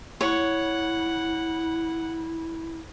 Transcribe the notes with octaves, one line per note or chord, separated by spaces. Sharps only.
E4 C#5 F#5